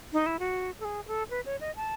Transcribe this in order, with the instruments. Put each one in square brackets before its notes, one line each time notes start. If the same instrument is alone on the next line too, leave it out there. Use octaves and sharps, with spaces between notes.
[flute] D#4
E4
F#4
A4
G#4
A4
B4
C#5
D#5
A5